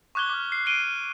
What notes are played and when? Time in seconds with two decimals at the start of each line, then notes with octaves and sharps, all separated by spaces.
0.15 C#6 D6 F#6 G#6 G7
0.30 D6 F6
0.52 C7
0.66 C7 D7 D#7 G7